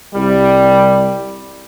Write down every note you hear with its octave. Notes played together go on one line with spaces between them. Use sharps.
C2 G3